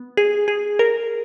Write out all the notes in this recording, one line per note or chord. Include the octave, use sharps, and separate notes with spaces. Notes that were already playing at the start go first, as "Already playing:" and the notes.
Already playing: B3
G#4
G#4
A#4